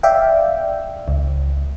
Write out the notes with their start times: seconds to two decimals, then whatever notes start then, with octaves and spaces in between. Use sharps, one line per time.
0.03 D5 E5 F5 G5
1.08 C#2